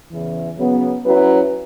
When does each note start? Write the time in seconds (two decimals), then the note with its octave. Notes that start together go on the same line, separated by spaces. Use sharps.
0.12 E2 C#3 E3
0.58 C#3 F#3 B3
1.04 F#3 C#4 E4 B4